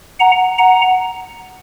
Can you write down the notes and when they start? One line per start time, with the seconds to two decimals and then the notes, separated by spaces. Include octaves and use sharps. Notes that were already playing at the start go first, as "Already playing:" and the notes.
0.20 F#5 A#5
0.58 F#5 A#5